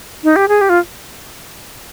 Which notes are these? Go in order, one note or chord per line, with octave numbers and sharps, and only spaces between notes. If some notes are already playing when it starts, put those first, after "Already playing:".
D#4
G4
G#4
G4
F4